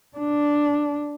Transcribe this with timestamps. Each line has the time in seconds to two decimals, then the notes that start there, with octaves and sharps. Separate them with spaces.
0.17 D4